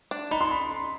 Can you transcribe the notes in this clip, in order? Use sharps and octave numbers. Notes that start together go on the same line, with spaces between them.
D4
D#4 B5
C6
B5